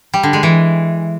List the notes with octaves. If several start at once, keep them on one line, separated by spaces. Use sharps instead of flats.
G3
D3
G#3
E3